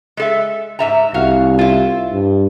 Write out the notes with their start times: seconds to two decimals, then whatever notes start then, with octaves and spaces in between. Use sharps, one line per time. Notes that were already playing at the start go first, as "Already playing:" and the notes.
0.17 G#3 A4 E5
0.79 G#2 E5 A#5
1.14 C2 F#4 F5
1.59 E4 F4
2.12 G2